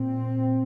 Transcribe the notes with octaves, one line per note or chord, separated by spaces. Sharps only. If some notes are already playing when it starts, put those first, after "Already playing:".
Already playing: A#2 C4